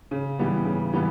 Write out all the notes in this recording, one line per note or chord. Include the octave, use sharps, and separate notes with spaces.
C#3
E3 G3 B3
C#3
E3 G3 B3